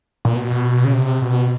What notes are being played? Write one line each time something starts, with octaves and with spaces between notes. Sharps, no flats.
A#2
B2
C#3
C3
B2